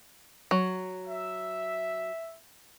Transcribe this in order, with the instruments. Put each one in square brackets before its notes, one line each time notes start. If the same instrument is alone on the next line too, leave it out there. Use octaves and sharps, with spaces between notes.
[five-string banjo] F#3
[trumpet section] E5